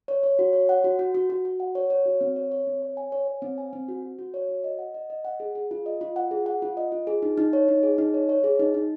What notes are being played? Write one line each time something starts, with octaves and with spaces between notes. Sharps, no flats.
C#5
C#5
F#4
C#5
F#5
F#4
F#4
F#4
F#4
F#4
F#5
C#5
C#5
F#4
C4
C#5
C#5
C4
C#5
G#5
C#5
C#5
C4
G#5
C4
F#4
F#4
F#4
C#5
F#4
D#5
F#5
D#5
D#5
F#5
G#4
G#4
F4
D#5
F4
F#5
G#4
F#5
F4
D#5
F4
G#4
D#4
D#4
C#5
D#4
G#4
D#4
C#5
C#5
G#4
D#4
D#4